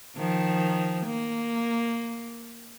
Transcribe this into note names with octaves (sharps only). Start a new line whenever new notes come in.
D#3 F3
A#3